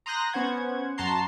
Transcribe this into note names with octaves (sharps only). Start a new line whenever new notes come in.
A#5 C6 D#6 F#6 G6 A#6
B3 C#4 C5 F#5 G#6
F#2 F#4 A5 A#5 C6 C7